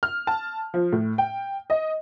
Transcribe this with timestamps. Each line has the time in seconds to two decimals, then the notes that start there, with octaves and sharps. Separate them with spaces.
0.03 F6
0.27 A5
0.74 F3
0.93 A2
1.18 G5
1.70 D#5